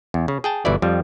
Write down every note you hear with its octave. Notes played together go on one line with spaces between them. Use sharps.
E2
C#3
G#4 G5 A5
G1 B2 E3 E4 D5
F2 F3 G3